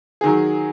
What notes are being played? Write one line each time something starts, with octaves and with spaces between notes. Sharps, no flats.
D#3 F#3 G#4